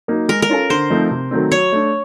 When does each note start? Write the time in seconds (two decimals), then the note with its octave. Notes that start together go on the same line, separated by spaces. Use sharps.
0.08 F#3 A#3 D#4
0.28 G#3 A#4
0.42 A#4
0.49 C#4 F4 A4
0.70 D3 C5
0.90 F3 A3 C4 D#4
1.11 C3
1.31 D#3 F#3 A3 C4
1.52 F#3 C#5
1.72 A3 D4